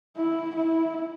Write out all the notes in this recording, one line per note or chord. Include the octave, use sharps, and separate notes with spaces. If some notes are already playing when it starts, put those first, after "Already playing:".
E4
E4